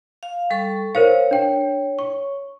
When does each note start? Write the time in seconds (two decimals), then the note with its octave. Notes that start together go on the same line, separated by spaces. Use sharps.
0.23 F5
0.50 G3 A4 C#6
0.95 A#4 C5 C#5 F5
1.31 D4 G5
1.99 C#6